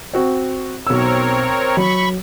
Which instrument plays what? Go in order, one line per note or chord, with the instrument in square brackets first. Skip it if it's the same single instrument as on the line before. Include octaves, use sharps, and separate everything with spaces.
[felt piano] C4 F#4
[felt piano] B1 E6 [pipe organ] C4 A#4 C#5
[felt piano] F#3 [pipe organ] B5 C#6